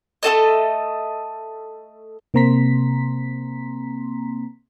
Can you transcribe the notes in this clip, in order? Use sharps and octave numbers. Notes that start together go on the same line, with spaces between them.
A3 F4 A4 D#5
C3 A#3 C4 A#5 C6 B6